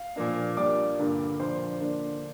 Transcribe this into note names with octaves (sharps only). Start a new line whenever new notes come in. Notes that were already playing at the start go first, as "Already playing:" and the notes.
Already playing: F5
A#2 F3 A#3 D4
A#2 G3 D4 D5 D6
G2 D3 A#3
A#2 F3 D4 C5 C6
D3 A#3 D4